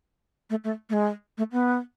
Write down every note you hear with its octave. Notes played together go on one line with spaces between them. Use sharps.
A3
A3
A3
G#3
A3
B3